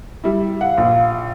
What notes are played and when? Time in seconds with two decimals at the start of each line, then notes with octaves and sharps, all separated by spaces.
0.24 G3 E4
0.61 F5 F#5
0.77 A#1